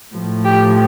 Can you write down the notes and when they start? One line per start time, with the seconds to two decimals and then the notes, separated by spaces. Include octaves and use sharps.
0.14 A2 F3
0.44 G4